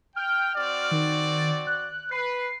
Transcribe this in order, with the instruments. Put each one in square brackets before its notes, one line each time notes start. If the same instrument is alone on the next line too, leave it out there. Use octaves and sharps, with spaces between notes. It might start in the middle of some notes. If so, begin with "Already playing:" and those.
[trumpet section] G5 [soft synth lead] F6
[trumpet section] C4 F#4 D5
[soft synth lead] D#3
F#6
[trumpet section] B4 [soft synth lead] C7